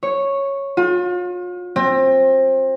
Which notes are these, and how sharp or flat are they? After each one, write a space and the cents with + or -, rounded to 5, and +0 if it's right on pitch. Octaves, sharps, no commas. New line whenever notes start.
C#5 -5
F4 +40
C4 +25